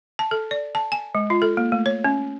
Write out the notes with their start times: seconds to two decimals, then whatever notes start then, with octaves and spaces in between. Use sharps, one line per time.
0.19 A5
0.31 A4
0.51 D5
0.75 A5
0.92 G#5
1.15 G#3
1.30 F4
1.42 A4
1.57 A#3
1.72 A3
1.86 C#5
2.04 C#4